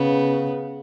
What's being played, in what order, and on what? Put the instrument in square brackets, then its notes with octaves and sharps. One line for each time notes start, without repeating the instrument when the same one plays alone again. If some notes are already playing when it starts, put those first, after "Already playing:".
Already playing: [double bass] C#3 [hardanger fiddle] B3